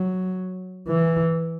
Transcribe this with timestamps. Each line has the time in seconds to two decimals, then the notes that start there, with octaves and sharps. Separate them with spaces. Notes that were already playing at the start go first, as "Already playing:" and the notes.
Already playing: F#3
0.88 E3